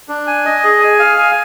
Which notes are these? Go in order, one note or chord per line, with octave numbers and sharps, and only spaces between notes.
D4
G#5
D#5
G#4
G#5
F5
G#5